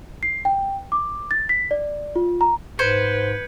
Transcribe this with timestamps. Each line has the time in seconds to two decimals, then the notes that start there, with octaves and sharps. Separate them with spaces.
0.23 C7
0.45 G5
0.92 D6
1.31 A6
1.49 B6
1.71 D5
2.16 F4
2.41 A#5
2.79 G#2 B4 C5 G6 G#6 C#7